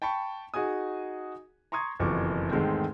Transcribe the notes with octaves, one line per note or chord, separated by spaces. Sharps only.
G5 A5 B5 C#6
D#4 F#4 G#4 G#5 D#6
A#5 C6 C#6 D#6 G#6
F#1 F2 B2 E3 C#6 D6
E2 G#2 D#3 G#3 A3 C4